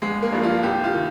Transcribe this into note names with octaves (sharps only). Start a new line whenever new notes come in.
G1 G#3
A#3
G2 F3
F4
C2 G4
F4
D#3